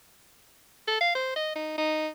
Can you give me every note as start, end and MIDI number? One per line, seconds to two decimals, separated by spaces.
0.88 0.98 69
1.01 1.14 77
1.15 1.32 72
1.36 1.51 75
1.56 1.77 63
1.78 2.08 63